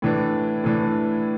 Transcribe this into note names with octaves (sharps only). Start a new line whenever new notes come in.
A2 E3 D4
A2 E3 D4